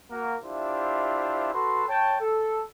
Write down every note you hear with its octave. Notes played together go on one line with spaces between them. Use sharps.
A#3 F#4 A#4
D4 E4 F4 G4 C5 E5
F#4 A4 B4 A5 C6
C#5 G5 A5
A4